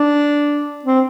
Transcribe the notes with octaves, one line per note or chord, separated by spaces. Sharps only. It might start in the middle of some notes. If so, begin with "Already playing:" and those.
Already playing: D4
C4